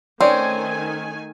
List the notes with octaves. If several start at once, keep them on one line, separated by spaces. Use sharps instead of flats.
D#3 A3 C4 C#4 C#5 D5 G#5